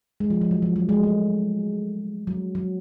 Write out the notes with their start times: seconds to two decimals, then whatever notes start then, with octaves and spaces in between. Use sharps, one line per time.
0.20 G#3
0.30 F3
0.41 F3
0.51 F#3
0.62 F3
0.76 F#3
0.89 G#3
1.03 A3
2.27 F#3
2.55 F#3